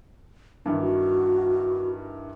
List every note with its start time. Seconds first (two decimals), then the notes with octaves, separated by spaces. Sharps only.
0.66 G2 D#3 E3 D4
0.80 F#4